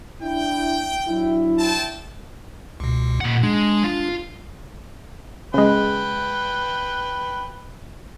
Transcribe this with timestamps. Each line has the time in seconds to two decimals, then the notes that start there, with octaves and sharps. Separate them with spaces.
0.22 D4 E4 G5
1.08 F#3 D4 E4
1.58 C4 G5 A5
2.80 C#2 B2
3.21 A#2 F#5
3.43 G#3 D4
3.84 F4
5.54 C#3 G#3 B4 G5